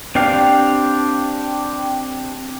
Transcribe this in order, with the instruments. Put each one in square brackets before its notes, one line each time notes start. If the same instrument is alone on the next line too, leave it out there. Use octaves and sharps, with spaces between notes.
[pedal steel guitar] C4 D4 G4 F5